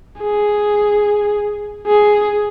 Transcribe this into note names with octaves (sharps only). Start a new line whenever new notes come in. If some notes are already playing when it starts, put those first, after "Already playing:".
G#4
G#4